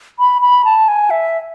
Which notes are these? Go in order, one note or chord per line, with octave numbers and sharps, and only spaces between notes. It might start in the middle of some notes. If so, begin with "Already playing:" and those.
B5
B5
A5
G#5
E5